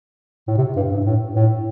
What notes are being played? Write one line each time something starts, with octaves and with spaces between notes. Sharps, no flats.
A2
C3
G2
G2
A2
A2